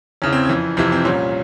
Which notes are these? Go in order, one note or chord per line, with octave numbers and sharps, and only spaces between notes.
E2 C#3 E3 C#4
C4
C#4
F2 E3
F2 C3 E3 C4
C4
C2 A#2 C#4